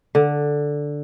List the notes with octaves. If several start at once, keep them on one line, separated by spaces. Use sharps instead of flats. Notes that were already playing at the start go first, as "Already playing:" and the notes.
D3